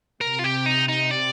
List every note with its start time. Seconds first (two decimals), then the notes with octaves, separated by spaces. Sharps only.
0.21 C3 A#4
0.39 F4
0.44 G4
0.66 D#4
0.88 D#4
1.11 D5